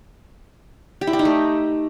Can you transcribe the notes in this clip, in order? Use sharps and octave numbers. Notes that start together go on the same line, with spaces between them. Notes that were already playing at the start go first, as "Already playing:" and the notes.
G4
E4
G4
D#4
A3